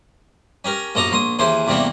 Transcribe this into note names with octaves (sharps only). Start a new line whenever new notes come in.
C#4 G4 A#4
A#1 F#2 A4 D#5 A#5 D6
A#1 C6 D#6
D#2 C#3 E3 C5 C6
E2 C3 G3 A3 A#3 D4